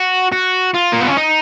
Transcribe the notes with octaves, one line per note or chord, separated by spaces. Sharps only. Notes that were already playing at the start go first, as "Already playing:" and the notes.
Already playing: F#4
F#4
F4
A#3
B3
C#4
D#4